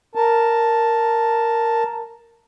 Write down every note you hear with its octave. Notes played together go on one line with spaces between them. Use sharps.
A#4 A5